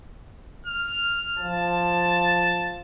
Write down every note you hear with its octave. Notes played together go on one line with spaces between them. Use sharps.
F6
F3 A5